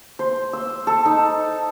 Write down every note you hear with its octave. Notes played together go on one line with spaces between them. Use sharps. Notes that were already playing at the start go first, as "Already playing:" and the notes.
C5
E6
A4
D#4